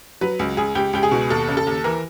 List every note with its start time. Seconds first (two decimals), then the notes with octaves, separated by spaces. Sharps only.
0.21 F#3 B4
0.39 C#2
0.57 C#2 G#4
0.75 C#2 G4
0.93 C#2 G4
1.03 G#4
1.12 B2
1.30 D#2 A4
1.48 C#3
1.57 A4
1.67 D#2
1.84 E3 A#4